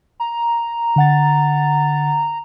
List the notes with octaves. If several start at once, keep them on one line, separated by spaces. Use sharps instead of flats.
A#5
D3 F#5 A6